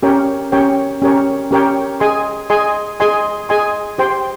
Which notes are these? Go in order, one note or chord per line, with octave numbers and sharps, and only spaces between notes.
C#4 G4 A#4 C#5 G5
C#4 G4 A#4 C#5 G5
C#4 G4 A#4 C#5 G5
C#4 G4 A#4 C#5 G5
G#4 D#5 G#5 C6
G#4 D#5 G#5 C6
G#4 D#5 G#5 C6
G#4 D#5 G#5 C6
G4 C5 G5 C6